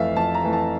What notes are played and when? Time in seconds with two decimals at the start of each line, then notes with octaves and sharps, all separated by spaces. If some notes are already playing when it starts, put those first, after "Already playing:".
Already playing: F2 E3 A3 E5 F5
0.16 F2 A5
0.34 A#5
0.44 E3 A3
0.53 A5